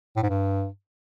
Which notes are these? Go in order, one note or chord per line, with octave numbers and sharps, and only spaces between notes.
A2
G#2
G2